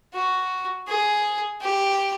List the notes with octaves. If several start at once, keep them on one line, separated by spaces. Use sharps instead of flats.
F#4
G#4
G4